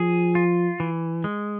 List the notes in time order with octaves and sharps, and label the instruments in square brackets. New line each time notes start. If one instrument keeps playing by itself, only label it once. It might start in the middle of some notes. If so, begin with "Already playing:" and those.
Already playing: [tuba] F3 [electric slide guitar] G#4
[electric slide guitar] F4
E3
G#3